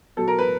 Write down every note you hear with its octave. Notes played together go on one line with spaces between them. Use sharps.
B2 F#3 A4
A#4
B4